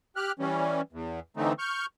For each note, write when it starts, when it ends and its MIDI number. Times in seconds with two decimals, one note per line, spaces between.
0.16 0.32 67
0.16 0.32 89
0.16 0.32 90
0.39 0.81 52
0.39 0.81 55
0.39 0.81 61
0.93 1.20 40
1.37 1.53 50
1.37 1.53 52
1.37 1.53 57
1.37 1.53 60
1.37 1.53 63
1.59 1.86 85
1.59 1.86 89
1.59 1.86 91